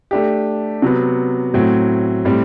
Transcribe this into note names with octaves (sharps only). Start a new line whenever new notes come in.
A3 D4 G4
C3 F#3 B3
A2 F#3 C4
A2 G3 C4